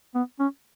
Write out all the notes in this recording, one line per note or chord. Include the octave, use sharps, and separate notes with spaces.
B3
C#4